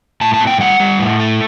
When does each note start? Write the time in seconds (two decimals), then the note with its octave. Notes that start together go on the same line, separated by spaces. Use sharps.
0.21 A2 A5
0.34 A5
0.41 B3
0.47 G5
0.60 G3 F#5
0.80 G3
0.99 A2
1.20 A3